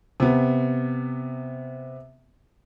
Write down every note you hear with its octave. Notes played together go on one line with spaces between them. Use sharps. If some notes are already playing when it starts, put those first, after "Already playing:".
C3 B3